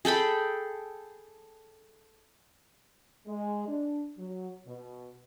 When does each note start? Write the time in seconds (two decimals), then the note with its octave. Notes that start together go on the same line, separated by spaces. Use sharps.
0.05 G#4 A4 G5 B5
3.27 G#3
3.68 D4
4.18 F#3
4.67 B2